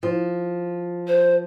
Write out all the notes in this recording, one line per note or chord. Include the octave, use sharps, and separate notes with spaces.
F3
C5